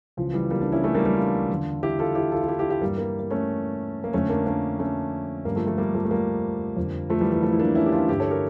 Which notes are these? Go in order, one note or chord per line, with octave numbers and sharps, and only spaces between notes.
C#2 C#3 E3 F3
E3 G3
G3 A#3
A#3 D4
C#4 E4
A3 C#4
G3 A#3
G3 A#3
D4 F4
E2 D3
E4 G4
F4 A4
E4 G4
F4 A4
F4
E4 G4
E4 G4
E4 G4
G2 E3 G3 A#3
G3 A#3
A#3
A3 C#4
A#3
F2 D3 A3 C#4
A#3 D4
A#3 D4
A3 C#4
G2 D3 G3 A#3
F3 A3
F3 A3
G3 A#3
F3 A3
A3
G3 A#3
F2 D3
F3 A3
E3 G3
E3 G3
F3 A3
E4
A#3 D4
C#4 E4
G4
D4 F4
G2 D3 E4 G4
A4 C#5
G4 A#4